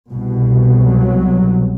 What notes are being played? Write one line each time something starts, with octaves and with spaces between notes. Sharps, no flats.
C2 B2
F#3